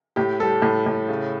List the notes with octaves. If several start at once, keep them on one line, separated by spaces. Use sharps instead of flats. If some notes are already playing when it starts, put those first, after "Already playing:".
A2 G4
G3 A4
A2
A2
C#3